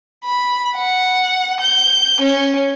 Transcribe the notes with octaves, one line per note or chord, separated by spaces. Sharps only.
B5
F#5
G6
C#4